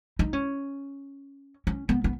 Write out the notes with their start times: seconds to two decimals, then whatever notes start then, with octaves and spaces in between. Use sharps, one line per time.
0.19 D#4
0.33 C#4
1.67 C#4
1.89 B3
2.04 B3